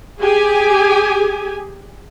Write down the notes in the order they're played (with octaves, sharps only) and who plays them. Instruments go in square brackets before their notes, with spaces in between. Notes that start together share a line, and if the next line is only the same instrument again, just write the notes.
[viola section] G4 G#4 G#5